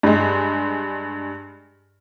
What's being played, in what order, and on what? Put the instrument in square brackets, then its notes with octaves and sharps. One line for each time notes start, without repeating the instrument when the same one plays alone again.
[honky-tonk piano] G2 G#3